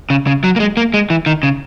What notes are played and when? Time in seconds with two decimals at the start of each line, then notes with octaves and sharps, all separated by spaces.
0.10 C#3
0.27 C#3
0.44 F#3
0.56 A#3
0.60 G#3
0.77 A#3
0.94 G#3
1.10 E3
1.26 D#3
1.43 C#3